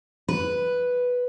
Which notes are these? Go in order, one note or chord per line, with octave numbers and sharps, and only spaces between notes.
B4